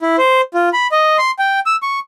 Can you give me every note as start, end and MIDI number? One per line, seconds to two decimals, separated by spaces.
0.01 0.16 64
0.18 0.41 72
0.54 0.69 65
0.73 0.87 83
0.92 1.17 75
1.18 1.31 84
1.39 1.59 79
1.66 1.76 88
1.82 1.99 85